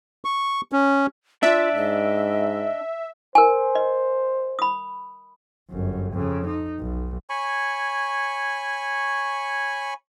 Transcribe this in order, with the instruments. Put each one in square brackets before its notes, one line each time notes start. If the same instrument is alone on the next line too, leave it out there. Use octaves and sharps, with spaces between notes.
[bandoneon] C#6
C#4
[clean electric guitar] D4 [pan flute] F4 [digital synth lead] E5
[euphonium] G#2 [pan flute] D#5
[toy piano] A#4 G#5 [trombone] C5
[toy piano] D#5
B5 D#6
[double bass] G1 F#2
F2 C#3
D#4
B1
[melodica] C#5 G#5 B5 C#6